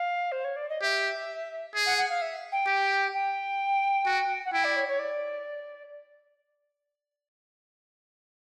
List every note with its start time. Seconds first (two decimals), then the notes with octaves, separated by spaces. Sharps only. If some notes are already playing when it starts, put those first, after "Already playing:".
Already playing: F5
0.32 C5
0.44 C#5
0.56 D5
0.69 D#5
0.82 G4 E5
1.75 G#4
1.86 F#5
1.98 F#5
2.10 F5
2.22 E5
2.52 G5
2.67 G4
3.14 G5
4.06 F#4
4.45 F#5
4.53 E4 G5
4.64 D5
4.76 C#5
4.88 C#5
4.99 D5